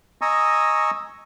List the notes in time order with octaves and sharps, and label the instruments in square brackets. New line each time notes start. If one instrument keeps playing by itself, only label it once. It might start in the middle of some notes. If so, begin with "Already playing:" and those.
[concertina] D#5 G#5 A#5 C#6 D#6 E6